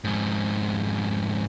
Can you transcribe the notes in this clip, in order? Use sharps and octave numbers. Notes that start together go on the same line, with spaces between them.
F2 G#2